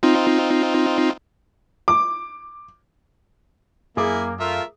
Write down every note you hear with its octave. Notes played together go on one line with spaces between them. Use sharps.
C4 D#4 F4
D6
F#2 A#3 E4 G#4 G#5 D6
A3 F4 A#4 E5